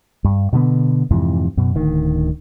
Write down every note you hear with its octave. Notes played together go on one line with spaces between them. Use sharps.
G2
B2 D3 F#3 B3
F2 G#2 C3 E3
F#2 B2
D1 D2 D#3